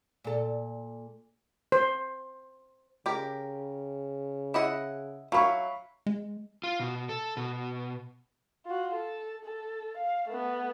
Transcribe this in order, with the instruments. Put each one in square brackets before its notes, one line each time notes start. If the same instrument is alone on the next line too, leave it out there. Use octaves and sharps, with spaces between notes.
[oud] A#2 A4
[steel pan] C5
[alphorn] C#3 [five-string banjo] G4 A#4
[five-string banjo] E4 D#5 F#5
[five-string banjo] F#3 E4 [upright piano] F5 B5 C#6
[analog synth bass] G#3
[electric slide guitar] F4
B2
A4
B2
[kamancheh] F4 F#4
A4
A4
F5
A3 B3